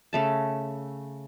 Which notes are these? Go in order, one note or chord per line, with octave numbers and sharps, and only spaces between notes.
C#3 A3 A5